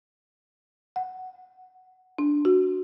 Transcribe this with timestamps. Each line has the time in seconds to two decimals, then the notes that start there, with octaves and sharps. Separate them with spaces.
0.96 F#5
2.18 D4
2.45 F#4